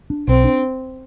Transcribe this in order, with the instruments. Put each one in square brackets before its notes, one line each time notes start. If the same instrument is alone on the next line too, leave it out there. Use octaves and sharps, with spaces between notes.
[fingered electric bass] D4
[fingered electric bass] B1 [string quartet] C4
[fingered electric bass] D4